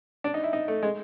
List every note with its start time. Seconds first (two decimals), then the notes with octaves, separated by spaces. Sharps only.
0.24 D4
0.34 D#4
0.43 E4
0.53 D#4
0.68 A3
0.83 G#3